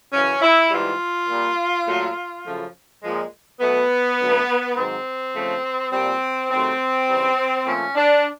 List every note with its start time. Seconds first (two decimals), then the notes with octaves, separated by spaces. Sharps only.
0.12 F#2 C#3 E3 C#4
0.41 E4
0.70 G#2 E3 G3 F4
1.28 A#2 G3
1.86 A#2 F#3 A3
2.44 F#2 C#3 F3 A3
3.02 A#2 F3 G#3
3.60 B2 F#3 A3 B3
4.18 F#2 D3 F#3 A3
4.76 G#2 D#3 F#3 C4
5.33 C#3 F3 A3
5.91 A#2 G3 C4
6.50 C3 D#3 F#3 A3 C4
7.08 C#3 E3 G3
7.65 A#2 F3 A3 C#4
7.95 D4